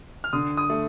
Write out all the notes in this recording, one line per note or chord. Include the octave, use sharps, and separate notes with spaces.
F6
D3 D#6
D#6
A3